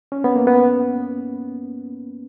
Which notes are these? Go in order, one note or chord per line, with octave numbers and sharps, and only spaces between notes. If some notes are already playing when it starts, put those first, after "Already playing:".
C#4
B3
A#3
B3